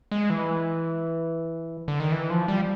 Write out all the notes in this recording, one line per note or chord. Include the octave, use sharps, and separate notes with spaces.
G#3
E3
D3
D#3
E3
F3
G3